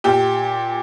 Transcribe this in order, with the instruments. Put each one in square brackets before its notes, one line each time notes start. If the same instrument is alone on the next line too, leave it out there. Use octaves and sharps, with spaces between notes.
[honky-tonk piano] A#2 G4